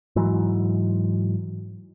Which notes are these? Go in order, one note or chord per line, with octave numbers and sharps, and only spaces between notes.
G#2 E3 F#3